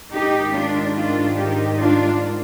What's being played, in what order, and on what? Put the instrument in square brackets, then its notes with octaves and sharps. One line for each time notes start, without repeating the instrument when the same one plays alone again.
[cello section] G#2 D#3 D#4 G4
D4 F4
D4 F4
D#4 G4
D4 F4